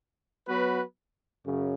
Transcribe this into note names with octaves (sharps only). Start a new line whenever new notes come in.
F#3 B3 F#4 B4
F#2 C#3